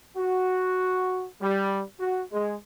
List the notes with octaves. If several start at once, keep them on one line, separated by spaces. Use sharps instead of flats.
F#4
G3
F#4
G#3